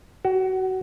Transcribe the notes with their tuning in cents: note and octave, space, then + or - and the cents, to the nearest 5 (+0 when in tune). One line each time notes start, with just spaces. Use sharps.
F#4 +25